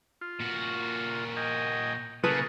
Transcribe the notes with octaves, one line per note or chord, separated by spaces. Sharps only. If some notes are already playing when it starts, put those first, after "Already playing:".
F4
A#2 F#4
D#5 G5 G#5
C#3 A#3 G#4 A4 B4 A5 C#6